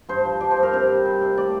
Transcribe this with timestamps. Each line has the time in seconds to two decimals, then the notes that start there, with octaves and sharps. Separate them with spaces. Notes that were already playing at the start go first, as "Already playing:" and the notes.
0.09 G2 C5
0.25 F3
0.40 F3 D5
0.51 C5
0.57 G2
0.63 A#4
0.73 C3 C5
0.89 G3
1.05 G3
1.21 C3
1.37 A2 D5